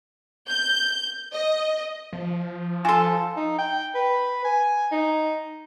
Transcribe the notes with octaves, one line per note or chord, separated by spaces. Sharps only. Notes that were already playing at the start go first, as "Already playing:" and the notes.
G6
D#5
F3
F4 A4 G#5 C6
D#4
G5
B4
G#5
D#4